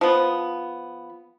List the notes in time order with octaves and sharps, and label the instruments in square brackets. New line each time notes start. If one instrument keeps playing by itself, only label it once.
[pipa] F3 B3